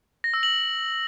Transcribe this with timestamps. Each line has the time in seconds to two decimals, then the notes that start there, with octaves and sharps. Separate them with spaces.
0.24 A#6
0.34 E6
0.43 F#7